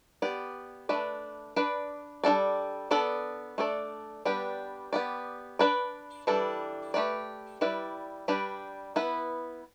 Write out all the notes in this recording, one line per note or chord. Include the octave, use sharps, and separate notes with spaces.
B3 G4 D5
A3 D4 B4 D5
D4 B4 D5
G3 D4 A4 D5
B3 D4 A4 D5
A3 D4 A4 D5
G3 B3 D4 G4 B4
B3 G4 D5
D4 B4 D5
E3 G3 D4 A4
A3 G4 B4 D5
G3 E4 B4 D5
G3 D4 G4 B4 D5
B3 E4 B4